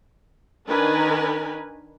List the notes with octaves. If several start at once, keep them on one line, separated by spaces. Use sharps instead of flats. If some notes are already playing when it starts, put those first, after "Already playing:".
D#3 D4 A#4 B4 G#5